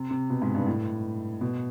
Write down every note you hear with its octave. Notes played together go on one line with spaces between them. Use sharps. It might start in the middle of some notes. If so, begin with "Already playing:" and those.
Already playing: C3
C3
B2
G#2
G2
A2
B2